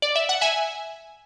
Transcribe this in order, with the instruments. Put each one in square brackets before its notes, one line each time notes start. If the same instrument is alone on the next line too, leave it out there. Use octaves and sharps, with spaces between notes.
[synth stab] D5
E5
F#5
E5 G#5